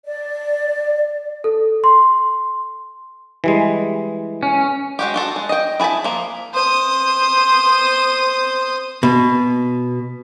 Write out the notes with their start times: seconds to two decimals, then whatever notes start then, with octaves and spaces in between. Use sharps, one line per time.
0.05 D5
1.44 A4
1.84 C6
3.44 E3 G3 G#3
4.43 C#4
4.99 G#3 F#4 G4
5.14 F4 F#4 A4
5.36 G#3
5.49 D#5 G5
5.80 E4 G#4 G#5 A5 B5
6.04 F3 A#3
6.54 C5 D#6
9.03 B2